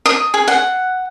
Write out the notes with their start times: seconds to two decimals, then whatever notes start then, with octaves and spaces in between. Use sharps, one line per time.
0.06 D#6
0.34 G#4
0.48 F#5